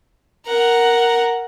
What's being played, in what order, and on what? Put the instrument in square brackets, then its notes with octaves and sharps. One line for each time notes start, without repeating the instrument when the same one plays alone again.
[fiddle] A#4 F#5